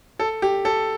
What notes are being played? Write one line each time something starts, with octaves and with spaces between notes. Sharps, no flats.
A4
G4
A4